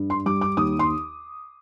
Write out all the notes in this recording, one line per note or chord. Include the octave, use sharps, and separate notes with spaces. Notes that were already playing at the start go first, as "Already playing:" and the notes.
Already playing: G2
C6
G3 D6
D6
D#2 D#6
C6